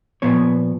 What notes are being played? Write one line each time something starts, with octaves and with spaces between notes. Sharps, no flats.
A#2 F3 B3 C#5